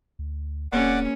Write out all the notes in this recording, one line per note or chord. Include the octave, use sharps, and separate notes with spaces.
D2
D#1 A#3 C4 C#4 G#4 D5 F#5 D6